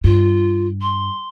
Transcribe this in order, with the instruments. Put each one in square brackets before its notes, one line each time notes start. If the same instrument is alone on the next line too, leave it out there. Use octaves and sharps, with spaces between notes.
[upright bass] G2 [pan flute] F4
[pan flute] C6